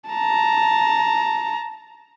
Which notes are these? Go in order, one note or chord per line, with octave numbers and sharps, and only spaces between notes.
A5 A#5